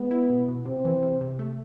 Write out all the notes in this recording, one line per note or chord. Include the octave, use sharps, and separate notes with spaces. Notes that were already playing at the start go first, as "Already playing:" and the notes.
Already playing: G#3 B3
E4
B2
B2
C3 C4
E3
C3
C3
A3